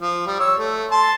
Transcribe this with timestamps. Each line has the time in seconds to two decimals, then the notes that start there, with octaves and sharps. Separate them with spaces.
0.01 F3
0.26 G3
0.40 C#5 E6
0.58 A3
0.91 A5 C6